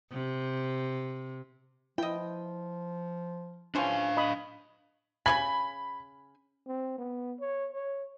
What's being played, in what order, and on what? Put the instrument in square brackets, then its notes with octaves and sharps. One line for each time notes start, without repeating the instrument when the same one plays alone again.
[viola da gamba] C3
[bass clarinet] F3 [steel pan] E4 [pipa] D#5 G5
[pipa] E3 F3 C#4 [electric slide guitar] D4 F5
[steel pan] D#5 B5 D#6
[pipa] C#3 F4 G#5 [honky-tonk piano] B5
[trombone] C4
B3
C#5
C#5